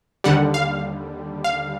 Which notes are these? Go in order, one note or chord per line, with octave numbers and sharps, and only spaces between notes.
D#2 D3 G3 F#5
F5
F5